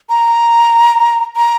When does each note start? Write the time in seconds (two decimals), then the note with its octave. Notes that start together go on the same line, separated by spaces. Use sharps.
0.09 A#5
1.36 A#5